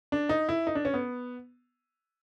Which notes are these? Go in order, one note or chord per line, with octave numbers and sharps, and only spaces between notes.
D4
D#4
E4
D#4
D4
C#4
B3